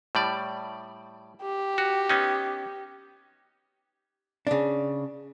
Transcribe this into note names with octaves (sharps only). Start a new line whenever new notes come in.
A2 G3 D5
G4
F#4
B3 C#4 D#4
C#3 D4